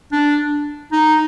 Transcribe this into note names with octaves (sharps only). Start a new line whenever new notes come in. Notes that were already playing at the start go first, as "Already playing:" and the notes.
D4
D#4